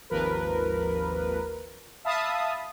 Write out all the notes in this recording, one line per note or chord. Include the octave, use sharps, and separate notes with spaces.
G#1 D#2 F3 A#4 B4
E5 F5 A5 B5 D#6